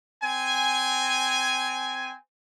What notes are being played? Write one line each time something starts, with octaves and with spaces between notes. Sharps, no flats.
C4 G#5